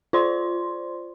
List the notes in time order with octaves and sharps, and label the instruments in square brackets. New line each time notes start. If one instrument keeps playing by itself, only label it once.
[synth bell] F4 C5 D5 C6